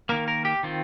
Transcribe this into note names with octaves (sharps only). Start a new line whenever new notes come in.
D#3 A#3 A#4
A#4
G4
D#3 C4 F4